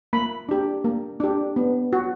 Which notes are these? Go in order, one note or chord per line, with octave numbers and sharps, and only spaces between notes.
A#3 B5
D4 G4
A#3
D4 G4
B3
F#4